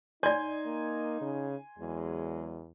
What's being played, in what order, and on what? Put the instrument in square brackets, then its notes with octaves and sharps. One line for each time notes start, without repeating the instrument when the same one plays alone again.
[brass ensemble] D#4 [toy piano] C#5 D5 [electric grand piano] G#5 C6 G#6
[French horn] A#3
C#3
[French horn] E2 [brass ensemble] F#3 G#3